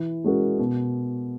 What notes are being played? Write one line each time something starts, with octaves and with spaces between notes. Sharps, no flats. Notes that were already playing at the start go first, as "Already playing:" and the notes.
Already playing: E3
G#3 C#4 F#4 A#4
B2